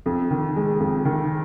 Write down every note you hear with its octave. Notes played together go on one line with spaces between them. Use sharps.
F2
D#3
G#3
F2
D#3